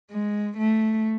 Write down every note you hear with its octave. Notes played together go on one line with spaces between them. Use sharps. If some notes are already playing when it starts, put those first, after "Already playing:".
G#3
A3